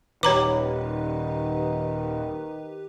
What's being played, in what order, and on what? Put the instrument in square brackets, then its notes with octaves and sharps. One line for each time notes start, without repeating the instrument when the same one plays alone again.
[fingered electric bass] D#1 [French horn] D#3 [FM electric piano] G4 B4 [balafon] C#5 A#5 D6